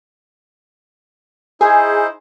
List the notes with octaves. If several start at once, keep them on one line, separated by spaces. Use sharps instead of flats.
D#4 E4 G#4 C5